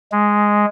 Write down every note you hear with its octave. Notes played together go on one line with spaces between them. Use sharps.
G#3